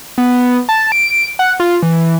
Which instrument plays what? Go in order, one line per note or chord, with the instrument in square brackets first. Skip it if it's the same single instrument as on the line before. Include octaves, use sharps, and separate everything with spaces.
[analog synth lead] B3
A5
D7
F#5
F4
E3